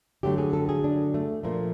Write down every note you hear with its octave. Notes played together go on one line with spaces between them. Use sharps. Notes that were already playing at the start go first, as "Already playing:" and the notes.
D3 F#3 A3 G4
G#4
A4
G#4
D4
A3
A#2 F3 A3 A#3